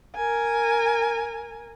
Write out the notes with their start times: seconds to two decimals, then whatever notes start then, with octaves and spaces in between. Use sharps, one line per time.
0.16 A#4 G#5